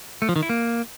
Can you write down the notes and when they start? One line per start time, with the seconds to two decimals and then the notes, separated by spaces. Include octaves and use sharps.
0.22 A3
0.29 F3
0.36 D#3
0.43 E4
0.49 A#3